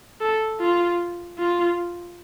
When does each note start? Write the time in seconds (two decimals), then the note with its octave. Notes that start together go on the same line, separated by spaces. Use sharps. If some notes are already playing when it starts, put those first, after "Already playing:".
0.21 A4
0.60 F4
1.39 F4